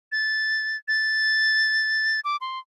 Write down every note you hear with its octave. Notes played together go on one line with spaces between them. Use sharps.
A6
A6
D6
C6